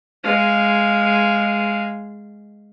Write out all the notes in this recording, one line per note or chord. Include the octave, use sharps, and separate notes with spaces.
G#3 F5